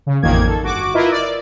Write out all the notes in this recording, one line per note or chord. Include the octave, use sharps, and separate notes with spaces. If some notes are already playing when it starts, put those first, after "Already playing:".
C#3
A1 F2 A#2 D#3 A#3 G#6
A4
G1 F#4 D6
E4 F4 A#4 B4 D#5 E5
D5